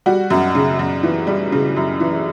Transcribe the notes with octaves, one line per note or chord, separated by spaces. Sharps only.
G3 F#4
F#2
C#3
F#2
E3
G3
C#3
F#2
E3